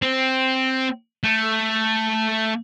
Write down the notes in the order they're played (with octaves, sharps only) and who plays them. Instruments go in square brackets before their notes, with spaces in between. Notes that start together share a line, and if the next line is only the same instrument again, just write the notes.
[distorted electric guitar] C4
A3